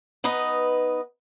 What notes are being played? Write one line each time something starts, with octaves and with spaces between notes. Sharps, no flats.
B3 D#4 B4 D#5